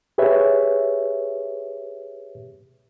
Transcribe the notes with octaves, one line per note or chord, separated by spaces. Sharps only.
G4 G#4 B4 C#5 E5